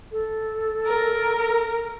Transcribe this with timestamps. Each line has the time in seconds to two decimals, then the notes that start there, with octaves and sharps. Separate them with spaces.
0.11 A4
0.86 A#4